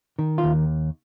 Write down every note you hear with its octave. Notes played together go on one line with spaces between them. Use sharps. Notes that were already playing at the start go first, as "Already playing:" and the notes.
D#3
F4
D#2